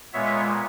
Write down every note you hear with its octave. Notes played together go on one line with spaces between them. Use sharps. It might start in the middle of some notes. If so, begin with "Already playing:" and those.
A#2 G#3 B3 C#5 E5